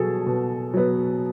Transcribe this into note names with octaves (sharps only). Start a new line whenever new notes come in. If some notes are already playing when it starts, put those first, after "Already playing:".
Already playing: B2 F#3 B3 F#4 G#4 A4
B2
F#3 B3